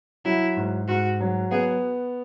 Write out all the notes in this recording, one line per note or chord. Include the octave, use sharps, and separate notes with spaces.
F#3 E4
G#2
G#2 F#4
F#3
B3 G#4